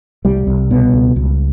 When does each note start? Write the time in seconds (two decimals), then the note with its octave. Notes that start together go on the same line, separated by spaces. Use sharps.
0.25 C2 G3
0.47 C2
0.71 B2
0.94 C#2
1.16 C#2